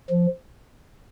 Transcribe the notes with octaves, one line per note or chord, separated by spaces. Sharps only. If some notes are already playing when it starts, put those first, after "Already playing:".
F3